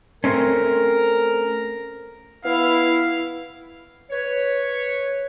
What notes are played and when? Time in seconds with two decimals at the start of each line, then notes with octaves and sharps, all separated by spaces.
0.24 A3 C4 C#4 A#4
2.45 B3 E4 F5
4.11 B4 C#5